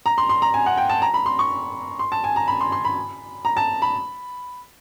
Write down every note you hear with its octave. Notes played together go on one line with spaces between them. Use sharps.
A#5
C6
C6
A#5
G#5
F#5
G5
A5
A#5
B5
C6
C#6
C6
A5
G#5
A#5
B5
C6
C6
B5
A#5
A5
B5